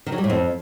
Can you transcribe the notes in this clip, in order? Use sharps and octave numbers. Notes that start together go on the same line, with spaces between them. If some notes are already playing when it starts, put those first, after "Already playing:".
D#3
F#3
G3
A2
F2